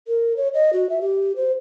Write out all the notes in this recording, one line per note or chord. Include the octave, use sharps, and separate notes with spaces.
A#4
C#5
D#5
F#4
E5
G4
C5